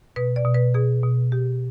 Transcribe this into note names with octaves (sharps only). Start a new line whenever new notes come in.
B2 B4
D5
B2
B4
B2 G#4
B2
B2 G4